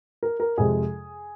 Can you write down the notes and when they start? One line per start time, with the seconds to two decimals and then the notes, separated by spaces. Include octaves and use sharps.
0.23 A#4
0.40 A#4
0.58 F2 C3 G#3 G#4